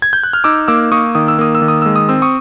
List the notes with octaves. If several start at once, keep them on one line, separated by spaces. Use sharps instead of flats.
G#6
G6
F#6
F6
D#4 D6 E6
A#3 D6 E6
A#3 C#6 D#6
D#3 D#6
E6
A#3 D#6
E6
D#3
D#6
G#3 E6
D#6
C4 E6
C#6 D#6